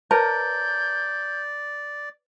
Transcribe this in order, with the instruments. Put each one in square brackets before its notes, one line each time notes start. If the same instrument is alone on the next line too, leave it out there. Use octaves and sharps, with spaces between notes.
[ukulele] A#4 [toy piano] B4 C#5 A5 [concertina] D5 [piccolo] G6